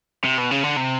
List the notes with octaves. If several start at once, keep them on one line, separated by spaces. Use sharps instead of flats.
C3
B2
C#3
D3
C3